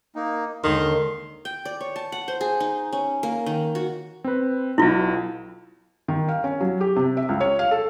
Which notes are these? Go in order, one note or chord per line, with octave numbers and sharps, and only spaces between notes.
A#3 D#4
D#2 D3 D#3 G#3 C6
G5
D5
C#5
A5
F#5
C5
G#4
D#4
C#4
A#3
D#3
F#4
C4 B4
B1 B2 E4 F4
D#3
F5
C#4
F#3
G4
C3
E5
C#2
C#5
F5
A4